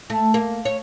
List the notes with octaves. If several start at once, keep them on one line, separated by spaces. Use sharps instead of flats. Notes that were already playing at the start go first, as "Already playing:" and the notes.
A3
A#3
C#5